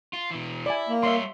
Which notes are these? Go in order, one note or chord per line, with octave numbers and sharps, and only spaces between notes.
F4
B2 E3
E4 D5 G#5
A#3
G3 C#5 E5 F5 C6